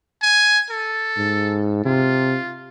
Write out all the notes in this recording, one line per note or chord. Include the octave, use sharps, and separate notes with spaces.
G#5
A4
G#2
C3 F4